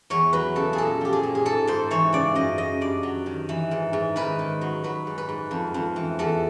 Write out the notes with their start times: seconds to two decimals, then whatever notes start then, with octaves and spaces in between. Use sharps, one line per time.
0.10 E2 C#5
0.33 F#3 B4
0.55 C#3 A4
0.73 G#4
0.78 A#2 A4
1.01 F3 G4
1.13 G#4
1.23 A#2
1.35 G#4
1.45 G#2 A4
1.67 G#2 C5
1.91 E3 C#5
2.13 C#3 D5
2.35 F#2 D#5
2.58 F#2 D#5
2.81 G2 D5
3.03 F#3
3.26 D#3
3.49 E3
3.71 G#2
3.93 G#2
4.16 D#3 B4
4.39 D#3
4.61 F#3
4.84 F#3 B4
5.07 G#2
5.18 B4
5.29 G#2
5.51 F2
5.74 F2
5.96 E3
6.19 E2 A4